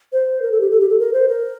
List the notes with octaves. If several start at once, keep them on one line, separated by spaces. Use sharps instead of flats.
C5
A#4
A4
G4
A4
G4
A4
A#4
C5
A#4